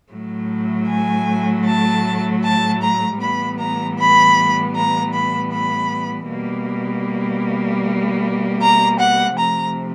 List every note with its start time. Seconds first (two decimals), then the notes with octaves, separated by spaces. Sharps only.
0.11 A2 F#3 A3
0.88 G#5
1.65 A5
2.43 A5
2.81 A#5
3.20 A2 E3 G3 B3 B5
3.58 A#5
3.98 B5
4.75 A#5
5.13 B5
5.52 B5
6.29 B2 G3 A#3
8.60 A#5
8.99 F#5
9.37 C3 F3 A3 A#5